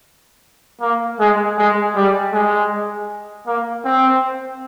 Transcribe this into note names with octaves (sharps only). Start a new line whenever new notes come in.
A#3
G#3
G#3
G3
G#3
A#3
C4